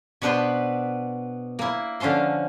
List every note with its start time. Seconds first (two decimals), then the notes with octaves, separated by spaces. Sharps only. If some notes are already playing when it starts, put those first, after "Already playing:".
0.22 B2 B3 D4 B4 C5 C6
1.59 A#3 E4
2.00 D3 F3 C#4 A5 C6